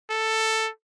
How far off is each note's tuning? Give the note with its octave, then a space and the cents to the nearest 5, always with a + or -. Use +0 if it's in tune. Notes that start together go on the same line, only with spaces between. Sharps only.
A4 +10